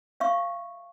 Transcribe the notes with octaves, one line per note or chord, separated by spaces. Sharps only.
E5 F5 C#6